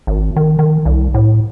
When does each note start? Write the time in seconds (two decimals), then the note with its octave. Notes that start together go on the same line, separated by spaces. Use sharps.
0.07 G#1
0.36 D#3
0.59 D#3
0.85 C2
1.14 A2